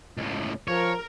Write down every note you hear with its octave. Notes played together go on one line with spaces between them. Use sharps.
C#2 A2
F3 A#4 C#5